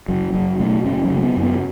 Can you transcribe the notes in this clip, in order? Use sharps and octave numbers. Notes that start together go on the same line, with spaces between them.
F#1 F#3
F#1 F#3
B2 A3
F#1 C#4
F#3
C#3
A3
B3
F#2
B3